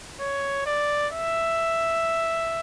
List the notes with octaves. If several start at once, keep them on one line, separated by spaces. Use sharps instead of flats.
C#5
D5
E5